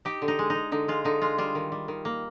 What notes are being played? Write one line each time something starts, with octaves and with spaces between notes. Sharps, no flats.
D#4 G4
D3
D#4
G#3
D#4
G#3
D3 D#4
G#3 F4
D3 D#4
G#3 F4
G3 F4
D#3
G3
D#3
A#3